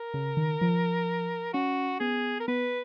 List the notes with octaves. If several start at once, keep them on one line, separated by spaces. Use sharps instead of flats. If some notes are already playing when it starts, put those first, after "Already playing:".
Already playing: A#4
C#3
D#3
F3
C#4 F#4
B3 G#4
A#4
B3 B4